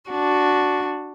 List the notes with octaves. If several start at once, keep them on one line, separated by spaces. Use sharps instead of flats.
D4 F#4